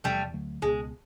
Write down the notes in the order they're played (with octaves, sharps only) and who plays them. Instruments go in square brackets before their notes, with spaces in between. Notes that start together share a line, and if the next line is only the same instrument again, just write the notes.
[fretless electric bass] E2 C3 F3 [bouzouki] G3 A3
[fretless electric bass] D2 D3 F#3 A3
[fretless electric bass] C#2 B2 G3 B3 [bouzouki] G#3